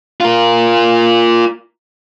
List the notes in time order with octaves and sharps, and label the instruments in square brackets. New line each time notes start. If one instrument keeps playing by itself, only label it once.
[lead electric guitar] F4 A#4